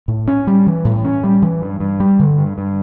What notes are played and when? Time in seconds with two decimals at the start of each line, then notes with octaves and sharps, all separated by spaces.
0.08 A2
0.28 C#4
0.47 G3
0.66 E3
0.85 A2
1.05 C#4
1.24 G3
1.42 E3
1.62 G2
1.80 G2
2.00 G3
2.19 D3
2.38 G2
2.58 G2